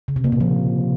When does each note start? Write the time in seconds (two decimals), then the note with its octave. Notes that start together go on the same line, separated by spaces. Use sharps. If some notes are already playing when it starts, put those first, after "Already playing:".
0.08 C#3
0.16 C3
0.24 A#3
0.32 A#2
0.40 F3